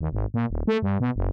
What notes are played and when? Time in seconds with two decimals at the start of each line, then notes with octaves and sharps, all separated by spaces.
0.01 D#2
0.13 G#1
0.34 A#2
0.50 D#1
0.67 A3
0.82 G2
1.00 B2
1.16 F#1